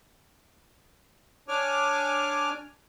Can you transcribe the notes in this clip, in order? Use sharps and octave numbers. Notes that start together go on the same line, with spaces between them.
D4 C#5 G#5 D6 F6